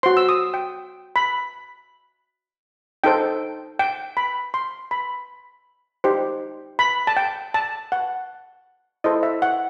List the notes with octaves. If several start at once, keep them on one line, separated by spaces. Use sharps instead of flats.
F#4 C5 C6
E6
D#6
G5
B5
D#4 A4 C5 G5
G5
B5
C6
B5
D#4 G4 C5
B5
A5
G5
A5
F#5
E4 A4 C5 D#5
E5
F#5